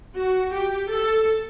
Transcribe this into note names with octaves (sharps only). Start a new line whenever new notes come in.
F#4
G4
A4